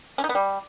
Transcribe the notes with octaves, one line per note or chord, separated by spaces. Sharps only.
C#4
D#4
B3
G3